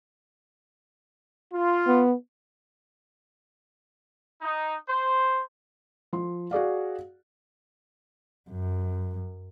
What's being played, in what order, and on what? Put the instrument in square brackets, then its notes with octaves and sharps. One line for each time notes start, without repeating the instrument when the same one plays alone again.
[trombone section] F4
[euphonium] B3
[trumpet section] D#4
C5
[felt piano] F3 C6
F#4 G#4 D5 F5
[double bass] F#2